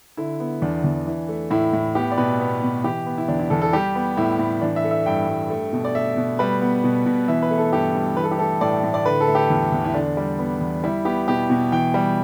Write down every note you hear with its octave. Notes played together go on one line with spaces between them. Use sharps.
D3 E4
B3
E2 D4
E2
E3
A3
A2 E4
A2
B3 G4
D5
B2 B4
B3
B2
E3 G4
B3
E4
E2 D4
E4
E2 A4
A4
G3 G4
B3
A2 E4
A2
E3 D4
E5
A3
E5
G2 G5
G2
A3
B2
D5
A3 E5
B2
G3 B4
B3
B2
B2
E3 E5
B4
A3
A4
G2 G4
G2
E3 B4
A4
G4
A3 A4
A2 D5
A2
D5
D3 B4
A4
A3
G4
E2 E4
E2
E4
D3 D4
G3
B3
E2
G3 E4
B3 G4
B2 G4
B2
E3 G5
G3